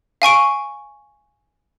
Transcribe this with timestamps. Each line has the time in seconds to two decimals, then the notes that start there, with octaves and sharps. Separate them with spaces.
0.22 F5 G#5 C#6 D7